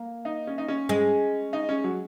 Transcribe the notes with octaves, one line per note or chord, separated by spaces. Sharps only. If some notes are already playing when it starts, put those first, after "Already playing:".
Already playing: A#3
D#4
C#4
D#4
C#4
G#3
D#4
C#4
F#3